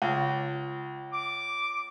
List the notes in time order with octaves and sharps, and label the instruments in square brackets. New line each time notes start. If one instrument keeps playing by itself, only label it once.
[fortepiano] C#2
[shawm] D6